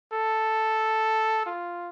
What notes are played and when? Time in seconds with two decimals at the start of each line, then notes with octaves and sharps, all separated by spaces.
0.13 A4
1.46 F4